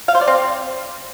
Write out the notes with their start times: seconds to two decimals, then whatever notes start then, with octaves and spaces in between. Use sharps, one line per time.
0.08 F5
0.15 C5
0.21 D5
0.28 C4